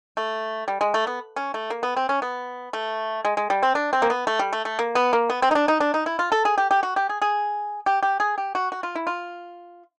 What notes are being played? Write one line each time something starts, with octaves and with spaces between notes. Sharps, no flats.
A3
G3
G#3
A3
B3
C#4
A3
A#3
B3
C4
C#4
B3
A3
G#3
G#3
G3
C4
D4
C4
A#3
B3
A3
G3
A3
A3
A#3
B3
A#3
B3
C4
D#4
D4
D#4
D4
D#4
E4
F4
A4
G#4
G4
G4
F#4
G4
G#4
G#4
G4
G4
G#4
G4
F#4
F#4
F4
E4
F4